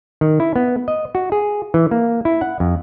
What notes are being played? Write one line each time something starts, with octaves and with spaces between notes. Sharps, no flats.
D#3
E4
B3
D#5
F#4
G#4
E3
A#3
E4
F#5
F2